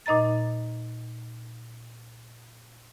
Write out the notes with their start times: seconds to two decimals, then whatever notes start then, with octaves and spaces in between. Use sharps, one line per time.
0.06 A#2 D#4 D#5 A#5 A6